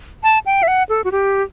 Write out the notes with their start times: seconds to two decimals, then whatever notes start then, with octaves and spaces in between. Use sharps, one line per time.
0.23 A5
0.46 G5
0.63 E5
0.68 F#5
0.89 A4
1.04 F#4
1.12 G4